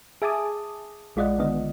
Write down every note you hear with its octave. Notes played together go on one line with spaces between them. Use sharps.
G#4 E5 G#5 A5 D6 D#6
A#1 G#3 F4 D5 D#5 F#5
D3 D#3 B3 D#5